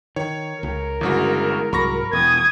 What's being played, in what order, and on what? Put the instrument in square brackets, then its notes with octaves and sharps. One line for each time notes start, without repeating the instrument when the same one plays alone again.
[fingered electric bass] D#3 [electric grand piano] C#5
[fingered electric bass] C#2 [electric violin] A#4
[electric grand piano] G1 C#3 F#4 [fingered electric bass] E3 G#3
[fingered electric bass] C2 G#2 F#3 [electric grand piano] B5 C#6 A#6
[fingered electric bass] E1 [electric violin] D#6 G#6